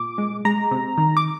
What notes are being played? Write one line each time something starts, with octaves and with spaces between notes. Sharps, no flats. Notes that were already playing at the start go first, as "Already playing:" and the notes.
Already playing: A#2 D6
G#3
G#3 A#5
C3
D#3
D6